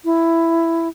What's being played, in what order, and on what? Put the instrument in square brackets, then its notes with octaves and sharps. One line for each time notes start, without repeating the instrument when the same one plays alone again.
[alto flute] E4